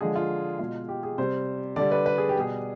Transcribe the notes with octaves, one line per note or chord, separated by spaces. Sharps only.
D3 F3 G#3 G#4
F4
B2 G#3 F4
G4
G#4
C3 G3 C5
D3 G3 D5
B4
B4
G#4
G4
B2 G3 G#4